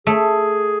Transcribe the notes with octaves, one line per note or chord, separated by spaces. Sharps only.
A3 G#4